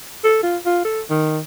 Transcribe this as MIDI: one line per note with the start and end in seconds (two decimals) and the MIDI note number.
0.24 0.38 69
0.43 0.57 65
0.66 0.84 65
0.85 1.01 69
1.10 1.39 51